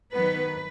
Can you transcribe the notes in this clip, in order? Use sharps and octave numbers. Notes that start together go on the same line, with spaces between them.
D#3 F#3 B3 B4